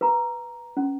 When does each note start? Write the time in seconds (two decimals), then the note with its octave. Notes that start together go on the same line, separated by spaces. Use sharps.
0.01 B4 A#5
0.77 C#4